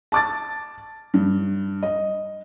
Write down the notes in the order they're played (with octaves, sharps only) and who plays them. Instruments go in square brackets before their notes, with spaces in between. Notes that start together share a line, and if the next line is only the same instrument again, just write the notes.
[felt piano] A5 D6 A6
G2
D#5